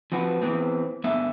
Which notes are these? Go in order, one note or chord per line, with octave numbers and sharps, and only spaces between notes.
F3 C4 F#4 B4
E3 B3 C4
G2 D3 B3 E5